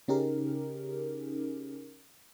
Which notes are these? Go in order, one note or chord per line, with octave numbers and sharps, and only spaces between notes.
C#3 C#4 D#4 G4 G#4 A#4